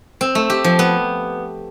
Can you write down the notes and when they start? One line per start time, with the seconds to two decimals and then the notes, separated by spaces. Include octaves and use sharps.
0.21 C4
0.35 A3
0.50 G4
0.64 F3
0.79 B3